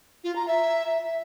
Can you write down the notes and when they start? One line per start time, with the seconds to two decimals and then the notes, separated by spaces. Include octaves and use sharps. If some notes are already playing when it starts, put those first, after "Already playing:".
0.24 F4
0.36 A#5
0.47 E5